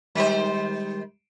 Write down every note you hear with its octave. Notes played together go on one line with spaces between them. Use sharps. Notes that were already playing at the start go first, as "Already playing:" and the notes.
D#3 G3 G#3 G4 C5